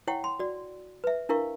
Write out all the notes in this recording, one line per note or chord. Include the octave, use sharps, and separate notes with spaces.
E4 C#5 F#5 G5 C#6
C6
F#4 D5
B4 E5
D4 E4 A#4 F5 C#6